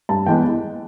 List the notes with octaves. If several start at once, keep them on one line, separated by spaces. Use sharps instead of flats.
G2 A5
E3 G#3 B3 G5